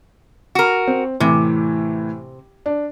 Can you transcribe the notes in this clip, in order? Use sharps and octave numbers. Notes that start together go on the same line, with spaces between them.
F#4 A#4
C4
A2 C3 E3
D4